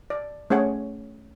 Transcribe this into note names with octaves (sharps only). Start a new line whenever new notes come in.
D5
A3 C#4 G#4 C#5 F#5